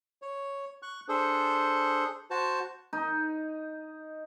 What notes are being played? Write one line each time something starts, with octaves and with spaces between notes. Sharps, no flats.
C#5
C#6 F#6
D4 G#4 A4 C5
F#4 C5 A5
D#4